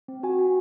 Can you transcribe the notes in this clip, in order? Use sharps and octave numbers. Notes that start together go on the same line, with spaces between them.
C4
F#4 G#5
F#4